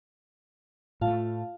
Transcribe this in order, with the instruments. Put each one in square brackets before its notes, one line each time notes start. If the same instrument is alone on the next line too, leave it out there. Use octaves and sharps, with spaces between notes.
[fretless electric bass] A2 A3 [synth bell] F4 F5 A5